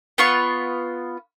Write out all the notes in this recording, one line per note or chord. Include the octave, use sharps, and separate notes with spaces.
B3 F4 C#6